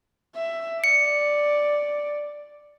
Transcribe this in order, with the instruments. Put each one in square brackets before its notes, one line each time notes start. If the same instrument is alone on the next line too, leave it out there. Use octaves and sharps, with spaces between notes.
[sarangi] E5
[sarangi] D5 [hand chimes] C#7